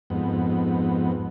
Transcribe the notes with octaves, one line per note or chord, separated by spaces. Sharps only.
F2 G#2 B3